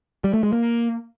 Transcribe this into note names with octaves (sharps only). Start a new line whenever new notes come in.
G3
A3
G#3
A#3